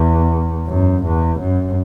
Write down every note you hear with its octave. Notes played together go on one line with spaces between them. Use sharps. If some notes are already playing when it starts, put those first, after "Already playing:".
Already playing: E2
F#2
E2
F#2